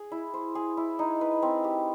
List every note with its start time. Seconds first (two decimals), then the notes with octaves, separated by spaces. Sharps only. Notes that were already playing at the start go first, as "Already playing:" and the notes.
Already playing: G#4
0.12 E4
0.34 C5
0.55 G#4
0.77 E4
0.99 D#4
1.21 B4
1.42 C4
1.64 G4